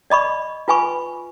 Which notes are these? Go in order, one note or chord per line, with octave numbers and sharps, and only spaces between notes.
D5 D#5 B5 C#6
F4 B4 G#5 B5 C#6